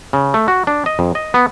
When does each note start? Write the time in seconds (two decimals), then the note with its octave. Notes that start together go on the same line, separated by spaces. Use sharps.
0.13 C#3
0.34 A3
0.48 F#4
0.67 D4
0.86 D#5
0.99 F2
1.15 D#5
1.34 B3